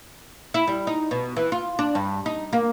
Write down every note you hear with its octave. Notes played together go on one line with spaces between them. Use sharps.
E4
G3
D#4
B2
E3
F4
D4
G2
D#4
A#3